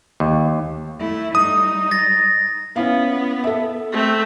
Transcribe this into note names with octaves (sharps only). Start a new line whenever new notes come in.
D#2
A3 E4
G3 D#4 D#6
A6 A#6
B3 C#4 E4 F5
A4 E5
A3 C4